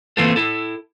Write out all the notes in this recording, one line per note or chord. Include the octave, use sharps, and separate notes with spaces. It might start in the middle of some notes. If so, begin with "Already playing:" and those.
E3 A3 A#3 C4 F4 A4
E4 A4